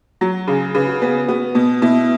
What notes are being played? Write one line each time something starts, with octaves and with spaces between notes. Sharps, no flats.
F#3 F#4
C#3 G#4
C#3 B4
F#4
B3 G#4
B3 F#4
B2
B2 E4